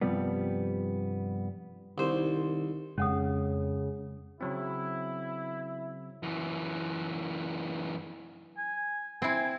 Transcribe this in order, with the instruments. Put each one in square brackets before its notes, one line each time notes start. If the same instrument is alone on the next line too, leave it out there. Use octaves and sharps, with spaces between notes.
[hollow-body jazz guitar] G2 C3 F3 G3 B3
[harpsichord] C2 C5 [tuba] D#3
[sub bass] F2 [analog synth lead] C#3 [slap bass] G#3 [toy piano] C#4 F#5 D#6
[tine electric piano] C#3 F#3 C4 [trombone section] E4
[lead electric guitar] F#2 E3
[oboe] G#5
[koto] C4 E4 [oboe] G#5